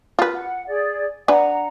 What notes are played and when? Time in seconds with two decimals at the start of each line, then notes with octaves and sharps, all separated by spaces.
0.19 F4 A#4 B4
0.33 F#5
0.67 G#4 D5
1.28 D4 B4 F#5 G#5 A#5